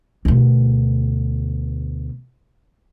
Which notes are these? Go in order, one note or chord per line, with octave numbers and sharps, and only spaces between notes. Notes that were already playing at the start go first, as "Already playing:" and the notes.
D2 B2